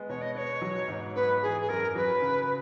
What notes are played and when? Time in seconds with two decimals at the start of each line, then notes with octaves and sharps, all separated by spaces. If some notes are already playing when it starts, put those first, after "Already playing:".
Already playing: G#3 B3
0.08 B2 C#5
0.21 D#5
0.33 B3 C#5 D#5
0.62 F#3
0.88 G#2
1.15 B3 B4
1.42 E3 G#4
1.61 G#4
1.69 F#2 A#4
1.95 F#3 B4
2.22 C#3